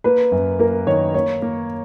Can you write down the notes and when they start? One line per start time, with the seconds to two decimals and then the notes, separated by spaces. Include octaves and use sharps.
0.04 A#3 B4
0.32 F#2
0.59 A#3 A#4
0.87 D#3 C#5
1.14 A#3 C#5
1.42 A#3